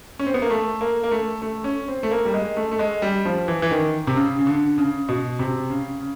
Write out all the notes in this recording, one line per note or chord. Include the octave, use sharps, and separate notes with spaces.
C#4
C4
B3
A#3
A3
A#3
A#3
A3
A3
C#4
C4
A3
A#3
G3
G#3
A3
A3
G#3
G3
F3
E3
E3
D#3
C3
C#3
C#3
D3
C#3
B2
C3
C#3
C#3